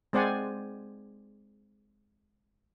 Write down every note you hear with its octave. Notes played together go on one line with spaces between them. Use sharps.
G#3 C4 C5 D5 F#5 G#5